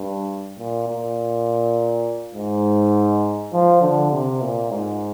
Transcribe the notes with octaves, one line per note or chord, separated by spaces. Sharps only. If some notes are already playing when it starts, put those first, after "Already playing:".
Already playing: G2
A#2
A#2
G#2
F3
D3
C3
A#2
G#2